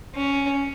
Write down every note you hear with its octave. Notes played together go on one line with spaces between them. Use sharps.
C#4